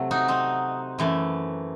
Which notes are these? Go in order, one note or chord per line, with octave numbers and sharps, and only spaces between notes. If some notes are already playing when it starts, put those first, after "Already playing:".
Already playing: C3 F#3 A3
D#4 F#4
C4 D#4
F#2 E3 A3